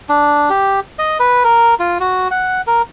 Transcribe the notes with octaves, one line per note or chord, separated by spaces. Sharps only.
D4
G4
D#5
B4
A#4
F4
F#4
F#5
A#4